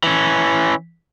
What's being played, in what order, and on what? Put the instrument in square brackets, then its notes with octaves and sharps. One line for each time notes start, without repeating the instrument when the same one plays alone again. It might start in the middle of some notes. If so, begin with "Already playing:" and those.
[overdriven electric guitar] E3 C#4